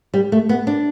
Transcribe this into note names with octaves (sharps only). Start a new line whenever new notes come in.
G3
A3
B3
D4